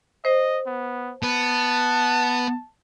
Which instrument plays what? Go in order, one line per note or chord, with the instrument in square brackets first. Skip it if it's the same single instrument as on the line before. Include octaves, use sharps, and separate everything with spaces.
[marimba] C5 [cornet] D#5
[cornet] B3
[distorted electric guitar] B3 [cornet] A5